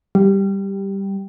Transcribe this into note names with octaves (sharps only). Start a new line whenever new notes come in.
G3